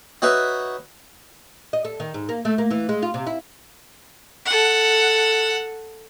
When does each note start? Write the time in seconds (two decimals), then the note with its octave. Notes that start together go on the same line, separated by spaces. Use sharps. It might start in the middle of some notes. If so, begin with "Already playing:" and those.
0.22 D#4 F#4 B4 C#5 E5
1.73 D#5
1.85 A4
2.00 D#3
2.14 G#2
2.29 A#3
2.45 A3
2.58 A#3
2.71 E3
2.89 G#3
3.02 F4
3.14 C3
3.27 E4
4.46 A4 F#5